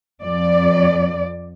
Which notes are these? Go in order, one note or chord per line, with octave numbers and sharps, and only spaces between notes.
F2 D5